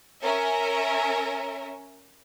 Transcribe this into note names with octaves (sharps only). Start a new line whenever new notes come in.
C#4 A#4 E5